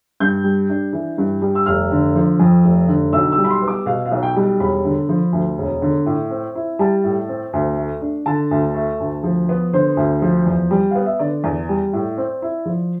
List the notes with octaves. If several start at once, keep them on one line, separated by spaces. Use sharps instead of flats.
G2 G6
G3
D4
E3
G2
G3
E6
F1 F6
D3
F3
F2
F1
D3
B1 E6
E6
G3
B5
C6
B3
D6
B2 F5
F5
B1
G5
G3
E1 B5
D3
F3
D2
E1
D3
A2
C4
E4
G3 A5
A2
C4
D2
A3
D4
D3 A5
D2
A3
D2
F3
B3
D3 C5
D2
F3
E2
G3
B3 F5
E5
D3 D5
E2
G3
A2
C4
E4
F3